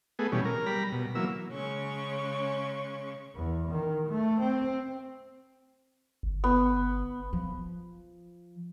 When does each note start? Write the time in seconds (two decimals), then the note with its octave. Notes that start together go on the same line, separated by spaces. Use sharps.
0.19 A3 B3 G#4
0.32 B2 E3 G3 C#4
0.45 A#4
0.66 G3 A#5 B5
0.92 B2
1.15 E3 F#3 A#3 E6
1.52 C#3 G#3 C#4 C#6
3.36 E2
3.71 D#3
4.10 A3
4.41 C4
6.23 G1
6.44 B3
7.33 F3